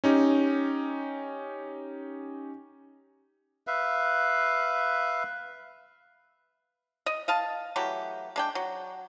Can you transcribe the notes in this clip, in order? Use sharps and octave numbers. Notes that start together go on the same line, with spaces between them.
C#4 D#4 G4
B4 E5 F5
D#5
D#5 F5 A5
E3 F#3 A3 G4
G#3 D4 G5
F#3